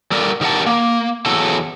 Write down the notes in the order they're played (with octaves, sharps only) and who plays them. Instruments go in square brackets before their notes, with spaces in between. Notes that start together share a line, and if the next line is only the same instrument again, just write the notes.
[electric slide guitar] G3 A4 A#4 D5
D#3 G3 A#4 F#5 A5
A#3
E2 F#3 A4